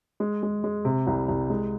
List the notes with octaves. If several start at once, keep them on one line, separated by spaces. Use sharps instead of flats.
G#3
G#3
G#3
C3
C2
C2
G#3